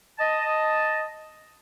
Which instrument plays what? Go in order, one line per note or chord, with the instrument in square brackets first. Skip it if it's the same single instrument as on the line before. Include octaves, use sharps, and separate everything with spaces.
[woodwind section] D#5 A5